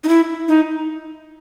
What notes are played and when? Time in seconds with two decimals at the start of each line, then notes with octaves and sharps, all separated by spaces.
0.04 D#4
0.09 E4
0.48 D#4